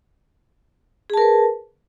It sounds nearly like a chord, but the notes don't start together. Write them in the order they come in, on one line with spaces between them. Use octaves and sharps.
G#4 A5 A#4 B4